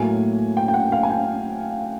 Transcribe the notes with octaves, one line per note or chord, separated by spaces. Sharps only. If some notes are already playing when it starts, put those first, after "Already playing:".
Already playing: A2 F#3 A#3 G#5
G5
G5
F#5
F5
G#5
G5